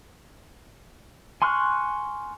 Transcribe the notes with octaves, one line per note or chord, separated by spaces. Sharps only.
G#5 C6 C#6 F6 F#6